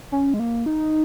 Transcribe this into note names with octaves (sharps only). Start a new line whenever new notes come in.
C#4
G#3
A#3
D#4